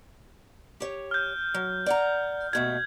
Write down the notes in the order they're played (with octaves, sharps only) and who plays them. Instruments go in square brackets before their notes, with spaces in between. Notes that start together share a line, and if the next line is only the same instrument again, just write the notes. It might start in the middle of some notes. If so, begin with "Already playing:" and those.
[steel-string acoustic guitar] G4 C#5
[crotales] F6 G6
[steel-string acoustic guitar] F#3
D5 F#5 A#5
[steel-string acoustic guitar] D#2 B2 A3 [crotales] G#6